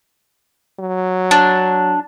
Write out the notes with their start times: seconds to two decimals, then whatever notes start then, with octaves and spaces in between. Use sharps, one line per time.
0.80 F#3
1.31 D4